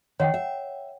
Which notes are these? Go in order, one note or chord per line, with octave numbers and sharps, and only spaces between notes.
D#3 C#5 F#5 G5
E5